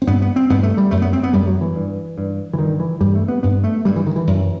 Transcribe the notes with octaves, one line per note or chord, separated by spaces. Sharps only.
C4
G2 B3
B3
C4
G2 B3
A3
G3
F#2 A3
B3
C4
B3
F#2 G3
F#3
E3
G2
G2
E3
G2 D#3
E3
G2 G3
A3
B3
G2 B3
A3
G2 G3
E3
D#3
E3
F#2